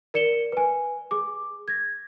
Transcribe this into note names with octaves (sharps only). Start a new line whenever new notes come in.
A#4 D5 C#7 E7 G7
B4 G#5
G#4 D6
G#6 A#6